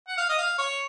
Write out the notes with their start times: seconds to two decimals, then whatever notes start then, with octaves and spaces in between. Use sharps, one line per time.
0.08 F#5
0.18 F5
0.29 D#5
0.38 F5
0.58 C#5